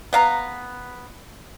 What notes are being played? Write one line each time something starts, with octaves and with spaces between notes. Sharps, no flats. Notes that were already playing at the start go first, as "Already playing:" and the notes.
B3 F5 A#5